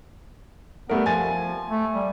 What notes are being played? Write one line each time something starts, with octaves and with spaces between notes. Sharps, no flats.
G3 A3 B3 A#4
F3 G#5 A6
A3
G3